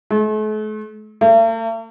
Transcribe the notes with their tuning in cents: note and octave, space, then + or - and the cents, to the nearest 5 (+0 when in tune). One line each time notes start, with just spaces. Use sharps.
A3 -45
A3 +45